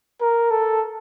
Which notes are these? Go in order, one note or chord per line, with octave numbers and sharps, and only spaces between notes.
A#4
A4